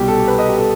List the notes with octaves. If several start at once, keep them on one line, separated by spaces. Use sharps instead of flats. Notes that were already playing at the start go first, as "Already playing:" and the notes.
Already playing: C2 B2 G3 G4
A4
B4
D#5
G4
A4